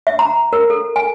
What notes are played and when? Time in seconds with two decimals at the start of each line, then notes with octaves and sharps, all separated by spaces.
0.07 E5
0.19 A#5
0.53 A#4
0.70 A4
0.96 G#5